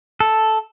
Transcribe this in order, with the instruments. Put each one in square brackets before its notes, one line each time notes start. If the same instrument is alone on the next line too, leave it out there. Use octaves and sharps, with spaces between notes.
[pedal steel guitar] A4